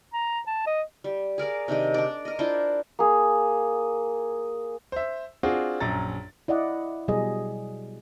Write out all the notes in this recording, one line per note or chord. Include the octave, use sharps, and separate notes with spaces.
A#5
A5
D#5
G3
G#4 A#4 D5 F5
C3 D#3 D4 D#5
D4 D5
A#4 D#5
D4 E4 F4 C5
A#3 G#4
C5 E5
C4 D4 F4 F#4 G#4
A#1 F#2 A#5 A6
E4 D5 D#5 F#5
B2 F#3 G3 G#4 D#5